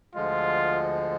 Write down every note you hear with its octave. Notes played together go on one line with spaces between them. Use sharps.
D2 D3 F3 G#3 F4